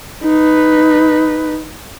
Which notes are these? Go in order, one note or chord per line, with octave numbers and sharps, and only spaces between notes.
D#4 B4